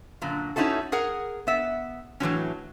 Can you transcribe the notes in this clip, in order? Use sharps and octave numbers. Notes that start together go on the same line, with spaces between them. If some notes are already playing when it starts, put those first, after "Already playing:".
F#2 A#2 D3
C#4 D#4 E4 F#4 A4
G#4 A#4 F#5
B3 E5
A2 E3 F#3 C#4